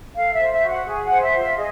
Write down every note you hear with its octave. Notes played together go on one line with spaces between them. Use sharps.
A4 F5
E5
C5
E5
F#4
F#5
G#4
F#5
C5
E5
F4
E5
G#4 D#5